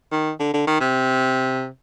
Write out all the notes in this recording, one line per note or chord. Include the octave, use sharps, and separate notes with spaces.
D#3
D3
D3
D#3
C3